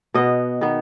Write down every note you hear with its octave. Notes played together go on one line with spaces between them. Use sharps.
B2 B3 D#5
D#3 B3